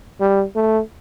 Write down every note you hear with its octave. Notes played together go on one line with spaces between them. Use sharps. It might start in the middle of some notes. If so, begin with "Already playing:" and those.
G3
A3